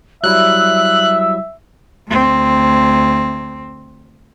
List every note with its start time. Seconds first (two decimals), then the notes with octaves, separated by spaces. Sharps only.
0.24 F#3 G3 E4 E5 E6 F#6
2.08 D2 C4